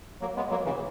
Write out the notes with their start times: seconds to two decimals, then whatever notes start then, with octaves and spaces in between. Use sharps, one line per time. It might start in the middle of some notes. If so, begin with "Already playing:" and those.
0.21 F#3 A#3
0.36 G#3 B3
0.50 F#3 A#3
0.65 C#3 E3